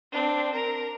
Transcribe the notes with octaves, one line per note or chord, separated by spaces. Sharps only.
C4 D4
A#4 A#5